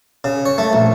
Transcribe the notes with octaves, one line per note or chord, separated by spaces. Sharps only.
C#3
C#5
A3
A#1